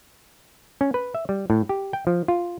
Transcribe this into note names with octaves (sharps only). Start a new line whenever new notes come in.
C#4
B4
E5
G3
A2
G4
G5
F3
F4